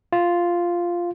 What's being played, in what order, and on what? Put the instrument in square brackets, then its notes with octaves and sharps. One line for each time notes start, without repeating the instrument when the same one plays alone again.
[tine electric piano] F4